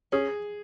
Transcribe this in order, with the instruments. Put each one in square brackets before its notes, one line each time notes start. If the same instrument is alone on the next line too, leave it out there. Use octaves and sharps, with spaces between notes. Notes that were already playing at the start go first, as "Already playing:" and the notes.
[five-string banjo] C#4 [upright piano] G#4